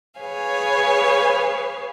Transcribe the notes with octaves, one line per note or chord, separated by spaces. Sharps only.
G#4 B4 C#5 F5 G#5